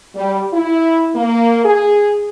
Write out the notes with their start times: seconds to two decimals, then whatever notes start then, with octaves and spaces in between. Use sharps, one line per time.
0.15 G3
0.53 E4
1.15 A#3
1.65 G#4